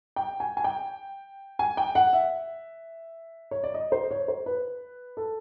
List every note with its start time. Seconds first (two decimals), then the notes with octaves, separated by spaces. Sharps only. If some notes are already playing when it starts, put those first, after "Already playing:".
0.16 G5
0.40 G#5
0.57 G#5
0.64 G5
1.59 G#5
1.77 G5
1.95 F#5
2.13 E5
3.51 C#5
3.63 D5
3.74 D#5
3.92 C5
4.11 C#5
4.28 C5
4.46 B4
5.17 A4